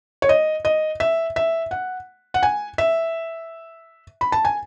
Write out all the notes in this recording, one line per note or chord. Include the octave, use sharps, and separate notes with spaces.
C#5
D#5
D#5
E5
E5
F#5
F#5
G#5
E5
B5
A5
G#5